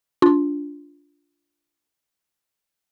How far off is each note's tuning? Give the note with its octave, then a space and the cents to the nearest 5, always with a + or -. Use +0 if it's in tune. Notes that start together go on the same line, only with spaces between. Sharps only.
D4 -20 F4 +0